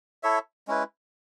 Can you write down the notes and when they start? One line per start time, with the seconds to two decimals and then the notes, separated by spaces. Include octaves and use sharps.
0.23 E4 A4 C#5 E5
0.68 G#3 C#4 E4 B4